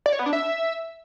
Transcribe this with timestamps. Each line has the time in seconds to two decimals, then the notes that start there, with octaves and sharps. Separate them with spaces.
0.06 D5
0.12 C#5
0.19 B3
0.26 D4
0.33 E5